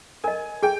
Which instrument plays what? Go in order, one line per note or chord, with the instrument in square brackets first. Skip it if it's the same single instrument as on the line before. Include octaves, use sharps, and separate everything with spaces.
[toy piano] A#4 D#5 [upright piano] G#5
[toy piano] G#4 [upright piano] G5